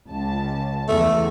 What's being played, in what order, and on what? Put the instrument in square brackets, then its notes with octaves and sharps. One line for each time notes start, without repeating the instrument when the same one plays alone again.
[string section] C#2 A5
[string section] E2 [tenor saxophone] A3